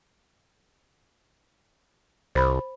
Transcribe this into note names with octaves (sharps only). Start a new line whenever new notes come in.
C2 C5 B5